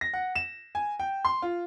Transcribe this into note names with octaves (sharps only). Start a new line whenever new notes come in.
A#6
F#5
E7
G#5
G5
C6
F4